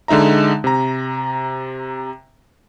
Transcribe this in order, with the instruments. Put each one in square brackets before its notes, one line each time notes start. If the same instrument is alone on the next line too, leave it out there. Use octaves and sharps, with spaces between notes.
[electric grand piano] D3 G#3 D#4 E5 A#5
C3 A#5